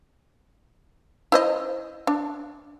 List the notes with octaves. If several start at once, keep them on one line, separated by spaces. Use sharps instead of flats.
E4 C5 D#5
D4